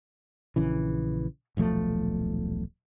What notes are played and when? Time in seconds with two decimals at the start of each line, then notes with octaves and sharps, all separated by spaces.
0.56 A#1 C#3 E3
1.57 D#1 B1 F3 A3